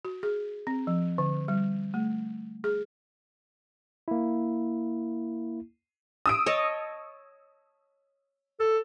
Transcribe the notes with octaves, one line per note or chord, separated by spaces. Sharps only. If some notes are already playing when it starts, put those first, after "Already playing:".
F#4
G#4
C4
F3
D3
G3
A3
G#4
A#3 E4
D#6 E6 D7
C#5 D#5 A5
A4